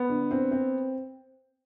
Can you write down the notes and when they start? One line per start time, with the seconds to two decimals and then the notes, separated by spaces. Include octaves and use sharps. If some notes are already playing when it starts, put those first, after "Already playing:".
Already playing: B3
0.10 D3
0.31 C4
0.51 C4